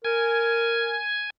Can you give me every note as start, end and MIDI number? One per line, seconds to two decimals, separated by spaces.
0.05 0.98 70
0.05 1.30 80